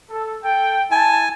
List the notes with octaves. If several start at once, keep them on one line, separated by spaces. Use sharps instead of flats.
A4
A4 G5
E4 G#5 A5